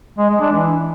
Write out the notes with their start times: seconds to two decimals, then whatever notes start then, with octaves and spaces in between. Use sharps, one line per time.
0.18 G#3
0.29 G#3
0.41 D4
0.52 E3